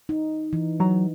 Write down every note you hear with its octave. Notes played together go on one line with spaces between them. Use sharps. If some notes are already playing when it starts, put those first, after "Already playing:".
D#4
E3
F#3 A#5